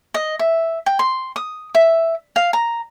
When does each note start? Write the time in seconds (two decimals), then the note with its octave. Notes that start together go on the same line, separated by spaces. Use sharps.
0.14 D#5
0.39 E5
0.86 G5
0.99 C6
1.36 D#6
1.75 E5
2.36 F5
2.53 A#5